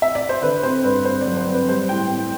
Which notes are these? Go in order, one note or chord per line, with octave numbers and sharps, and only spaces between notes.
E5
D5
C5
D3 B4
C4 C5
G2 B4
C4 C5
D5
F#3
C5
C4
B4
G3 C5
A2 G5
A2